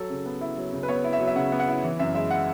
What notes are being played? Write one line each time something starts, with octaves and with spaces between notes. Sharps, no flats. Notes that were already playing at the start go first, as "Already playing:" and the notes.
Already playing: F#3 A4
C#3
B3
E4
F#3
C#3
B4
B3 C#5
E4
E5
F#3
E5
C#3 F#5
B3
F#5
E4
E3
F#2 E5
G#3 E5
F#5